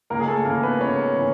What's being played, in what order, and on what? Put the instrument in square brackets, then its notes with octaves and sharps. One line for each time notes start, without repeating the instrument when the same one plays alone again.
[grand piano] C#2 A#3 A#4
G#4
A3 A4
C#3 A#3 A#4
E3
B3 B4
C#2 C#4 C#5
C#3 E3